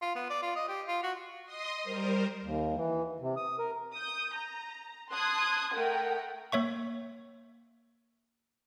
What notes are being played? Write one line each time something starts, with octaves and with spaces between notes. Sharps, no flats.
F4
B3
D5
F4
D#5
G4
F4
F#4
D#5 C6 D#6
G3 A#4 C5
D#2
E3
C3
D#6
A#4
D#6 G6
A#5
A5 C6 D#6 F#6 G#6
A3 A#4 F#5 G5
A#3 C#5 E5 C#6